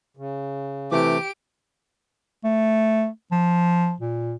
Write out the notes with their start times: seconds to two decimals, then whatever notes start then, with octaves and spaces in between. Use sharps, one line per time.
0.17 C#3
0.92 C3 E3 A3 G4 D6 D7
2.44 A3
3.32 F3
4.00 A#2